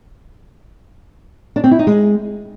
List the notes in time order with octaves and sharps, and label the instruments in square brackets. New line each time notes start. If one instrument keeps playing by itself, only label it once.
[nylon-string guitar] D4
C4
E4
D#4
G#3